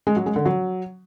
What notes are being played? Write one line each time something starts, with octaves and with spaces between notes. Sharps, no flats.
G#3
F#3
G#3
D3
F#3